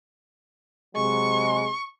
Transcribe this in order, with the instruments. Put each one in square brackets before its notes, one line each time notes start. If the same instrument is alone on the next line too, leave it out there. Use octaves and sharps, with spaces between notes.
[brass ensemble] C3 F#3 G#3 [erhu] C#6